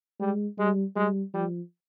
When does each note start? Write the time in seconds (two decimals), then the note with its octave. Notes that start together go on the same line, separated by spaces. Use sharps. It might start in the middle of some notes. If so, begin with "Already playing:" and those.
0.20 G3 G#3
0.58 G3 G#3
0.96 G3 G#3
1.34 F3 G3